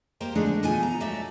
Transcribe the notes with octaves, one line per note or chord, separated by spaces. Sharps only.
A#3 G4 C5 D#5
D3 F3 G#3 A3 D4
B2 F3 A3 A4 G#5
A#5
F#3 A3 F#4 D5 E5